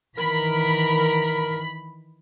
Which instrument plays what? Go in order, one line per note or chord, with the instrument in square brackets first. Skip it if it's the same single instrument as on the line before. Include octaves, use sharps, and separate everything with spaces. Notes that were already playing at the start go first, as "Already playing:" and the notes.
[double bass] D#3 E3 [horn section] A#4 [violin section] B5